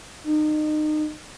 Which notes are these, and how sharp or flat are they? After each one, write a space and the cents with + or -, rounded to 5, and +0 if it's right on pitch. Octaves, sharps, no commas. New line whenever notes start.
D#4 -30